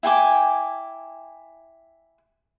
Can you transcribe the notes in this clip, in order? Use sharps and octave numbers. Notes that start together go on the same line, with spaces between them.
E4 G5 G#5 D6